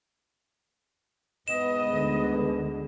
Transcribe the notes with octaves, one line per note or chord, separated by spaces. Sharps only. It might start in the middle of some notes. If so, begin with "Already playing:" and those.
E2 G#2 B3 D#5 E7
D2 D3 G#3